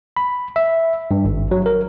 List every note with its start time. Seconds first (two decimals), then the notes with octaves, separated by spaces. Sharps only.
0.17 B5
0.56 E5
1.11 G2
1.25 G#1
1.51 F#3
1.66 A#4